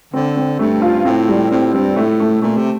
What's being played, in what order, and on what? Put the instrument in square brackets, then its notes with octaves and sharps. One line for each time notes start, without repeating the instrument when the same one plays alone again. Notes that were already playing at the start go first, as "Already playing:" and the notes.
[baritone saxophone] D3 [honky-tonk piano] C4
[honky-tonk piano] C4
[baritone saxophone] G2 [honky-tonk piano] A3
[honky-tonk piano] F4
[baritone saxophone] A2 [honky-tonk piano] C4
[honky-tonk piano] G3
[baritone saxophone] A2 [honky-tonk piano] C4
[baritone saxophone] G2 [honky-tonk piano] C4
[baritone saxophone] A2 [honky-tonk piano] A3
[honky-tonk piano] A3
[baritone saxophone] A#2 [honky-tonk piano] A3
[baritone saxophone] C3